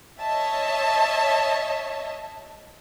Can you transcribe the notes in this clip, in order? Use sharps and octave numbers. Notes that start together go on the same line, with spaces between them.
C#5 D#5 E5 A5